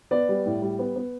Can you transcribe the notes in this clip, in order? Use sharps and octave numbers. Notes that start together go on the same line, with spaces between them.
B3 D5
G3
A2
G3
B3
B3